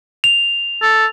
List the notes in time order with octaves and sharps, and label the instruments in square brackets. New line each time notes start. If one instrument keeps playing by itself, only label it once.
[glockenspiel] F7
[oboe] A4